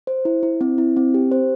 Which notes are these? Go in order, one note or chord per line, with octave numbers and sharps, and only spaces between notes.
C5
E4
E4
C4
E4
C4
G4
C5